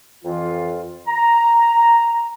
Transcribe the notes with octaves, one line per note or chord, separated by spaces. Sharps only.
F2 E3 F4
A#5